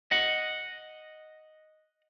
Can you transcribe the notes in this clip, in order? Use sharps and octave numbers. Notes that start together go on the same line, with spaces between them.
D#5 F#5